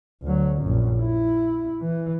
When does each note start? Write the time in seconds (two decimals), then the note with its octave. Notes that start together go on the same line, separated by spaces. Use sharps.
0.23 D2 F#3
0.61 A#1 F#2
0.99 E4
1.82 E3